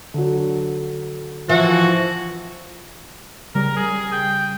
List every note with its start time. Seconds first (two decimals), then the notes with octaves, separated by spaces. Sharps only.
0.14 D3 F#3
1.49 E3 F3 F#4
3.55 C#3 G3 A#4
3.76 G#4
4.12 G5